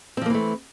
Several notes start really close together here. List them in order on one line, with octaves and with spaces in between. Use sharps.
C4 F3 A#3 E3 A3